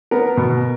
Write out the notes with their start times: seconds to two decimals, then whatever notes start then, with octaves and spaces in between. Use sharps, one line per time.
0.11 B3 A#4
0.37 B2